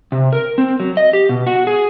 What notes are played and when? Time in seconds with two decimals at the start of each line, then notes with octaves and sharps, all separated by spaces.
0.12 C3
0.33 A#4
0.58 C4
0.80 F#3
0.97 D#5
1.13 G4
1.29 B2
1.47 F#4
1.67 G#4